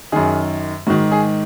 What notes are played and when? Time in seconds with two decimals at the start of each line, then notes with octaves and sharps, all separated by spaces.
0.12 F#2 D#3 G#4
0.87 G#2 F#4
0.90 D#3
1.12 G#4